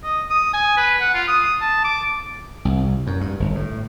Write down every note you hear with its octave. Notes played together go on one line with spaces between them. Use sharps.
D#5
D#6
G#5
B4
F#5
F4
D#6
A5
D6
C2
F#2
G2
G1
A2